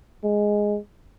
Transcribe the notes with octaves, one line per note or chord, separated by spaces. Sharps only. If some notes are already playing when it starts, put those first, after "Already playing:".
G#3